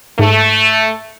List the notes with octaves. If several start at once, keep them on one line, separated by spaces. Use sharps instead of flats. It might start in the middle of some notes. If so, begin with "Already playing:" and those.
G#2 A3